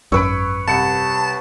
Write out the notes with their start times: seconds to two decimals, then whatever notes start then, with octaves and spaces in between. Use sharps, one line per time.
0.12 G#1 F#2 B4 C#5 E6 D7
0.68 C2 A5 C#7